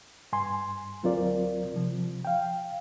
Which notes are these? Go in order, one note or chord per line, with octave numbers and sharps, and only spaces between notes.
G2 G#5 C6
D2 F#3 C4 F4 A#4 D5
C3 F3
F5 G5